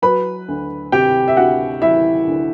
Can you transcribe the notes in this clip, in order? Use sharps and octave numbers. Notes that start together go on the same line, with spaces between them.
F#3 B4 B5
D2
C3 G4 G5
E5
D2 F#4 F#5
F#3 E4 E5
D2